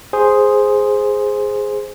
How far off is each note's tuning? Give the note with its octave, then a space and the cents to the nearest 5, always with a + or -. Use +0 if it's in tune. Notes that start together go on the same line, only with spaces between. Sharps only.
G#4 +0 C5 +0